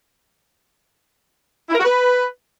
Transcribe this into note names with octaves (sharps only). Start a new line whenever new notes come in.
E4
A#4
F#4
B4